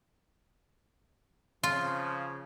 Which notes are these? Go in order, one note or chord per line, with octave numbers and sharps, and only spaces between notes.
C#3 F3 F4